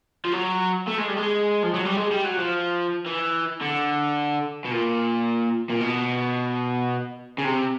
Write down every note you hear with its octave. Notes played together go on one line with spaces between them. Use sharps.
F3
F#3
A3
G#3
G3
G#3
F3
F#3
G3
G#3
G3
F#3
F3
E3
D3
B2
A#2
A#2
B2
C#3
C3